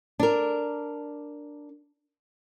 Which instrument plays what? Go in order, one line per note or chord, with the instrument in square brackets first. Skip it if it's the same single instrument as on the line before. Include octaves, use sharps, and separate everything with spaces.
[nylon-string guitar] D4 A#4